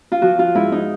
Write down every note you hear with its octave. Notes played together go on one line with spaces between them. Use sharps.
F4
F3 F#4
F4
G#2 E4
D#4